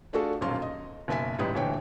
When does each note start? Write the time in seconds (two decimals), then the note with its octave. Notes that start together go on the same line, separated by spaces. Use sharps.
0.13 A3 D4 F4 F#4 G#4 A4
0.41 D#1 B1 F#2 F#3 F5 C6
0.62 D#5
1.08 F#1 B1 E5 G#5 B6
1.39 A1 G#2 G3 D#4 B4 D#6
1.54 D#1 D2 E3 C#5 G5